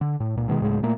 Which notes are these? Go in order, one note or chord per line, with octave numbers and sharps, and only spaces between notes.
D3
A2
C#2 A#2
G2 B2 D#3 G#3
D1 A2 C#3 G#3
A#2 A3 A#3